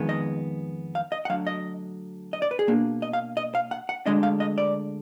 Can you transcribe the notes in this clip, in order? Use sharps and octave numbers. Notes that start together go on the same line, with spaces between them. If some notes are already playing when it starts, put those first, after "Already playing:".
Already playing: F2 D#3 G#3 B3
D#5
F5
D#5
F#5
D2 D3 F#3 F5
D#5
D#5
D5
B4
G#4
B2 A#3 D4
D#5
F5
D#5
F5
F#5
F#5
D2 D3 G#3 D4 D#5
F5
D#5
D5